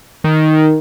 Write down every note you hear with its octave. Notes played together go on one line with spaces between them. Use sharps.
D#3